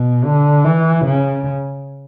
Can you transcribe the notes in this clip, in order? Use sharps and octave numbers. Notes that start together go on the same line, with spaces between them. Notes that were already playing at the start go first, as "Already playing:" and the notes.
Already playing: B2
D3
E3
C#3